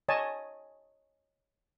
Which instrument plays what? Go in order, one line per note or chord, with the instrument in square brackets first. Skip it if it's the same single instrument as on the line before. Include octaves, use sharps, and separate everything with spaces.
[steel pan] C#5 D#5 G#5 A5